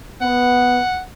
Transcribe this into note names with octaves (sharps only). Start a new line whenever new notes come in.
B3 F#5